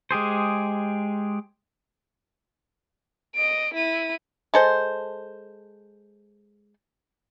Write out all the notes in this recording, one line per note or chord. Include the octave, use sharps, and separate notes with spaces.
G#3 G4 G#4 C5
D#5 D7
E4 D#7
G#3 A4 C5